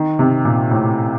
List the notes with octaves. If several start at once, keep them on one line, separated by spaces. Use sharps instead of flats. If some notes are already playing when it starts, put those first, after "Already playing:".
Already playing: D#3
C3
A#2
A2